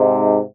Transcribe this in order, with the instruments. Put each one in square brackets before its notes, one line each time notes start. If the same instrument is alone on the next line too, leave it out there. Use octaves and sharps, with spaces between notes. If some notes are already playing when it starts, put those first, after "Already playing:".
Already playing: [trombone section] G#2 C3